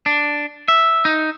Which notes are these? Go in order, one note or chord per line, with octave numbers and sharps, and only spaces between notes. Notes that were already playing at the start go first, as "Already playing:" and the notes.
D4
E5
D#4